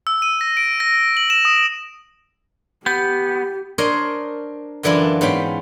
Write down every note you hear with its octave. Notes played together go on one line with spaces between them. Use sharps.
E6
D#7
A#6
D7
A#6
F#7
E7
D#6
B3 G4 G6
D4 A#4 C5 C#5 D#5 C6
F#2 D3 E3 D4 E4 F4
G#2 B3 C#4 G5